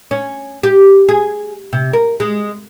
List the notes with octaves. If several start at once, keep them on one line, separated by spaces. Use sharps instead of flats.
C#4
G4
G#4
C3
A#4
G#3